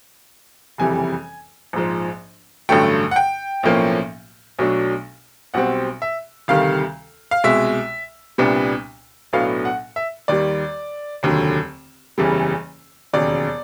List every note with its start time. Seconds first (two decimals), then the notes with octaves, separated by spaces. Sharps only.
0.78 F#1 F2 C3 E3 G3 G#5
1.73 A#1 G#2 F3
2.69 A1 G2 D3 F#3 A3 G5
3.11 F#5
3.16 G5
3.63 B1 A2 F3 A#3 C#4
4.59 B1 B2 F#3 A3 D4
5.54 B1 B2 G3 C4 F#5
6.02 E5
6.48 D2 C3 D#3 G3 F5
7.31 F5
7.44 C2 B2 G#3 E5
8.38 C2 A#2 G3 B3 D4
9.33 B1 A2 F#3 B3 D4 F5
9.65 F#5
9.96 E5
10.28 D#2 D#3 G3 D5
11.23 F1 D#2 D3 F#3
12.18 F#1 E2 C#3 E3 G3
13.13 E1 D#2 C#3 F#3 D5